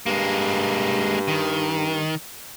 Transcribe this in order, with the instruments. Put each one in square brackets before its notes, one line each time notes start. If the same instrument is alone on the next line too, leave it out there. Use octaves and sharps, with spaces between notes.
[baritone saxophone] G2 [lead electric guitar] G#3 A#3
[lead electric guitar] D#3